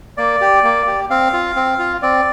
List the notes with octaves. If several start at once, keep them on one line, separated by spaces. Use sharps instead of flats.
A#3 D5
G4
A#3
G4
C4 F5
F4
C4
F4
C4 D5